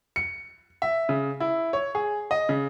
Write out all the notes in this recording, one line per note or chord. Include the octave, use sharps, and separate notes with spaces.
C#7
E5
C#3
E4
C#5
G#4
D#5
C#3